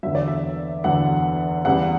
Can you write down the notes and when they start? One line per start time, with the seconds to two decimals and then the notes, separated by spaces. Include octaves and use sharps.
0.03 E2 D3 F#3 E5
0.15 D5
0.28 E5
0.84 E2 D3 F#3 F#5
1.65 E2 C#3 G3 F#5